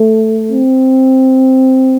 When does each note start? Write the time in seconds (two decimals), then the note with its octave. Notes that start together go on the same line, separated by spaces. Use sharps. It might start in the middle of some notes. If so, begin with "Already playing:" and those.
Already playing: A3
0.52 C4